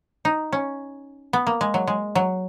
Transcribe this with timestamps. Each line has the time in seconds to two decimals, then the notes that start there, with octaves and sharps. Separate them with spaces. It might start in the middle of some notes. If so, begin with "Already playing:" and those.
0.25 D#4
0.53 C#4
1.33 B3
1.47 A#3
1.61 G#3
1.74 F#3
1.87 G#3
2.15 F#3